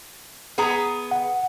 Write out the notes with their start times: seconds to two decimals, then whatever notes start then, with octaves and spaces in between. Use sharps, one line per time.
0.58 B3 G#4 A#5
1.11 F#5